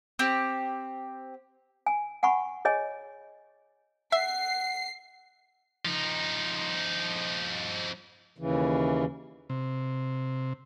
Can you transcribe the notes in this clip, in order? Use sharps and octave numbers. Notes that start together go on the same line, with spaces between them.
C4 G4
G#5
F#5 G#5 B5 C#6
G#4 C#5 D#5 G#5
E5 F#5 C7
F3 D#4
D#2 C#3 E3
C3